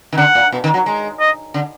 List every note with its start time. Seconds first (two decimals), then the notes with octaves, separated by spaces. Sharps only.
0.13 D#3
0.18 D3 F#5
0.35 A#2
0.52 B2
0.64 D#3
0.74 F#3
0.86 G#3
1.20 D#5
1.54 D3